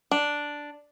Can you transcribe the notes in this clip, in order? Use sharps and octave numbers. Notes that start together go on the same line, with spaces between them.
D4